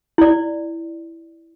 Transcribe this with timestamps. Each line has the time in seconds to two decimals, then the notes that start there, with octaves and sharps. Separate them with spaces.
0.18 E4 D5